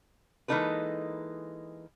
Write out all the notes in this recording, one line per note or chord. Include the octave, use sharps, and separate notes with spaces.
E3 G#3 A#3 D#4 A4 B4